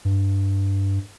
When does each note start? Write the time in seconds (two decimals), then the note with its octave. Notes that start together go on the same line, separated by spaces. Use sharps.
0.05 G2